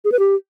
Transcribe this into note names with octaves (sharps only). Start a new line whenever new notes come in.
G#4
B4
G4